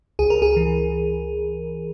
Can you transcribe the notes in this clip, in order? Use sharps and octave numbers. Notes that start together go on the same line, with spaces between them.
C#2 G#4
A#4
G#4
E3